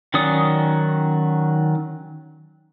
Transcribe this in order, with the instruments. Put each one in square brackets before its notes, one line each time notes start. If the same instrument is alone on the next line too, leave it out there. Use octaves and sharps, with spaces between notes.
[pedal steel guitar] D#3 F#3 C#4 D5 D#6